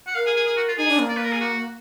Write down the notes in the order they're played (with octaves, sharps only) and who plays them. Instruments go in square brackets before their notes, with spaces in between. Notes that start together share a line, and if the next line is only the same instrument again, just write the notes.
[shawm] F#5
[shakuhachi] A#4 [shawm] F5
[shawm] G#4
G#4
G#4
F#4
F4
[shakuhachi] D#4 [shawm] G#4
[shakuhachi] D4
A#3
[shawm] D5
B4
A#4
G#4
F#4